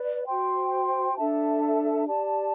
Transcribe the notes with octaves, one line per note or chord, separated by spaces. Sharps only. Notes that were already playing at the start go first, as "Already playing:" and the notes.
Already playing: B4 D5
F#4 C5 G5 C6
D4 A4 E5 A5
G4 D5 A5